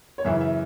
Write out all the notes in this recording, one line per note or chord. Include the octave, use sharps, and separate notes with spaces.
C#5
F#2 C#3 E3 E5
E5